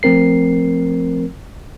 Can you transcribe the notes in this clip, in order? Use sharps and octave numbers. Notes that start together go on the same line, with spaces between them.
F3 A3 C4 A#4 C7